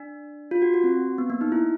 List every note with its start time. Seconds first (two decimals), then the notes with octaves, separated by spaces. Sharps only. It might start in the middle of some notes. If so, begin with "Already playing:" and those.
Already playing: D4
0.51 F4
0.62 F#4
0.74 F#4
0.84 C4
1.18 B3
1.30 A#3
1.41 D#4
1.52 E4